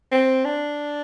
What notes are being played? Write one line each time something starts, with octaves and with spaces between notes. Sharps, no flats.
C4
D4